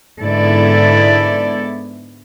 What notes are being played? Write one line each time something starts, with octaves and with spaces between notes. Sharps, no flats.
G#2 D3 B3 E4 A4 D5